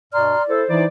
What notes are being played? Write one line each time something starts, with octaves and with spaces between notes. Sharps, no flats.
G2 B2 D5 A#5 C6 F6
E4 A4 C5
E3 D#4 E4 D5